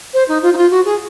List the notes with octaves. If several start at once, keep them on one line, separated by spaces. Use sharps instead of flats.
C5
D#4
F4
D#4
F4
F#4
G#4